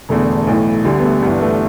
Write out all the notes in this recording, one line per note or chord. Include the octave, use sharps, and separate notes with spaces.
E1 E2 D3 A3
B1 A2 E3
D2 D3 G3
B3
A3
G1 G2 E3 B3
A3